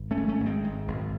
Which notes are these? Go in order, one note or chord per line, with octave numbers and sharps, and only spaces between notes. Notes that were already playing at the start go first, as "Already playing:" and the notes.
Already playing: G#1
A3 C#4
G#2
A3 C#4
G#1
G#3 C4
G#2
G#1